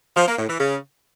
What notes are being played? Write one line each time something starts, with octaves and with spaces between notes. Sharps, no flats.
F3
A#3
A2
E3
C#3